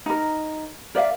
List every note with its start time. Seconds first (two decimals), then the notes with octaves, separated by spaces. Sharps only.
0.06 D#4 A#4
0.95 A#4 D5 E5 F5